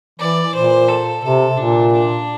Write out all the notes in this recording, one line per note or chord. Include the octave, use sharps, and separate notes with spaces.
E3 D5
A#2 C5
A4
C3 A4
A#2 D4
D4